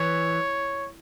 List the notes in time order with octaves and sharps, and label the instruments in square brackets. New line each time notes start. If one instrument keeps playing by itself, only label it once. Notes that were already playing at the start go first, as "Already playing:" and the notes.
Already playing: [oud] E3 [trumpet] C#5